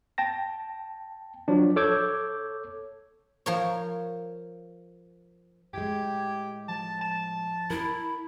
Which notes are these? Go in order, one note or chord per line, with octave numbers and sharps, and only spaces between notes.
G5 A5 A#6
F3 F#3 D4
A4 C#5 D6 E6 G6 G#6
F3 A#4 C#5
A2 G#3 G4 G#6
F3 A5
A5
E4 A#4 B5